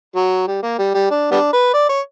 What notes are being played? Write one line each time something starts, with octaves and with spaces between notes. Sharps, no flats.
F#3
G3
A#3
G3
G3
D4
G3 B3 D4
B4
D5
C#5